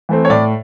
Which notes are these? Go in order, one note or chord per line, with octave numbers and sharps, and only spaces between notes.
E3 A3 C4
C#5
A2 D5